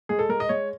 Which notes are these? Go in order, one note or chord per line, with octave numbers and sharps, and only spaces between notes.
G#3 G#4
A4
G#3 A#4
D#5
G#3 C#5